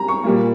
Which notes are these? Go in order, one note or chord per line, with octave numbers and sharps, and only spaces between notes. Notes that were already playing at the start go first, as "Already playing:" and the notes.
Already playing: G3 A#5
C#6
A#2 G3 A#3